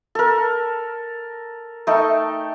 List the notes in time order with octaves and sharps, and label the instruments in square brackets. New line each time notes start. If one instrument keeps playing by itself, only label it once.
[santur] A4 A#4
A3 D#4 G5